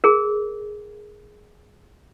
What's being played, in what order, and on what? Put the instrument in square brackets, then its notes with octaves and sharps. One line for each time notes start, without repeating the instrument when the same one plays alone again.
[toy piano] G#4 A#4